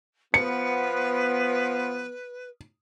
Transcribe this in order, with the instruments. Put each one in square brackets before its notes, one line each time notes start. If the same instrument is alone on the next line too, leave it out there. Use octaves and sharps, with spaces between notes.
[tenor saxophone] F3 [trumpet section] B3 [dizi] B4 [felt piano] C#7